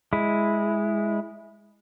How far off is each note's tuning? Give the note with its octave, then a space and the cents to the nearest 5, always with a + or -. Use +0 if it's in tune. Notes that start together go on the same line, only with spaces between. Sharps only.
G#3 +0 E4 +0